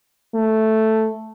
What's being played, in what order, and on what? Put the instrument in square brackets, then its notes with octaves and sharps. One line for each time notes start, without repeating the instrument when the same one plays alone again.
[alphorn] A3